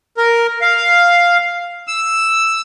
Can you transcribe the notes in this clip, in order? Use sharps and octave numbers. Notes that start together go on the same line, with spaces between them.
A#4
F5
E6